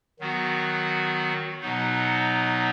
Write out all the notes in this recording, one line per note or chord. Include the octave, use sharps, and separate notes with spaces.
D#3 F#3 B3 F#4
B2 F#3 B3 D#4